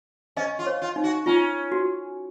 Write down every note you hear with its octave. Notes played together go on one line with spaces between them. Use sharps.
C#4 D#5
F4
C#5
F4
D#4
F#4
C#4 F4
F#4